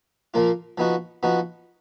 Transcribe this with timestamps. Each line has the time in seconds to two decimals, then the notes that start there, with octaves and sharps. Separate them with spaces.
0.34 A#2 F3 A#3 F4
0.78 F3 B3 D#4 F#4
1.23 F3 B3 D#4 F#4